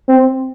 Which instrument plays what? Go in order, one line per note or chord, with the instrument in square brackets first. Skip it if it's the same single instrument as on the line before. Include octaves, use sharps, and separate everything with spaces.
[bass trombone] C4